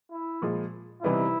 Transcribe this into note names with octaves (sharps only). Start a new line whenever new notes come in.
E4
A#2 F3 G#3
C3 E3 G3 B3 D#4 E4